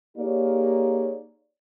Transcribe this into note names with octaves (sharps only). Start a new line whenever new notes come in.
A#3 D#4 G4 G#4 C#5 D5